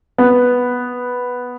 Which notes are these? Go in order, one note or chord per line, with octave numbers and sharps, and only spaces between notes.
B3